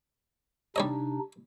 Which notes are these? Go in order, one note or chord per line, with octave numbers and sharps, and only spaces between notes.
C3 G3 D4 D#4 C#5 D#5